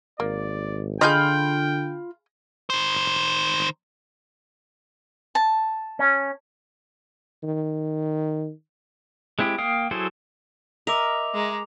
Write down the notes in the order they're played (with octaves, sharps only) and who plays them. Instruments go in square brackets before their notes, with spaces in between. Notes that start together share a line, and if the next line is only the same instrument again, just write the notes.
[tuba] G#1 [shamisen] A#3 [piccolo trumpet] D5
[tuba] D3 [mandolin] F4 B5 G6 [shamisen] G#4 D#5 [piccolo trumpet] G5
[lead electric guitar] D#3 C5
[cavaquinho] A5
[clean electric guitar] C#4
[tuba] D#3
[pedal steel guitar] G#3 C4 E4 G4
A#3 F5 G5 D#6
F#3 E4 G#4 A4 C5
[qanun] A#4 [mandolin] D#5 E5 [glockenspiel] D6 F7
[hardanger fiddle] G#3 A#5